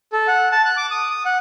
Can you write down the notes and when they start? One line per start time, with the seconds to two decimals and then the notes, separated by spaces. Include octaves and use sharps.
0.13 A4
0.28 F#5
0.52 A5
0.65 F#6
0.77 D6
0.91 D#6
1.10 D#6
1.25 F#5